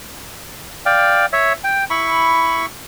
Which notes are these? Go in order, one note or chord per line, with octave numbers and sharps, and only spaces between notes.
D5 F5 G5
C#5 E5
G5
E4 B5 C#6